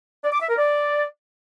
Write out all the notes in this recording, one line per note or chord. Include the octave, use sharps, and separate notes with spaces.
D5
D6
E5
A#4
D5